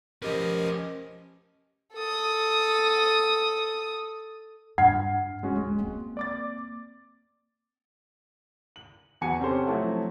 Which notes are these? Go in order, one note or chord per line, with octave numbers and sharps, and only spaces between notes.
F3 C#4 G4 A#4 B4 D#5
A4 D#6
G2 F#5 F6 G#6
D1 G#3 C#4 F#4
G#3
A#3 C4
D5 D6 A6
F#7
E2 F#4 G#5 C#7
C3 C4 C#4 G4 A4 C5
F3 F#3 A3 E4 F#4